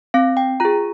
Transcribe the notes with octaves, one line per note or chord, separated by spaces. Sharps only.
C4 F5
G5
F4 G#4 A#5